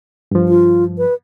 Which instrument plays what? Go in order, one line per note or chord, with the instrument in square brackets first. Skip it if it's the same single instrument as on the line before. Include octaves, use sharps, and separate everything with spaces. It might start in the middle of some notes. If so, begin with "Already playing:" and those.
[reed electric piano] G2 F3
[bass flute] F4
B4